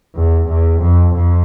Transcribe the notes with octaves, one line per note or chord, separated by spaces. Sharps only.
E2
E2
F2
F2